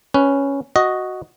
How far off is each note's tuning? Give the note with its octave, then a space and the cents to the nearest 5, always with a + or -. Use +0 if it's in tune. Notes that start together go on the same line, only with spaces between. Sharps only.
C#4 +0 B4 +0
F#4 +0 D#5 +0